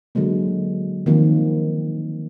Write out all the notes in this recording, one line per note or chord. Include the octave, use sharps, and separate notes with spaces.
D3 F#3 G#3 A#3
D#3 F3 A#3 C4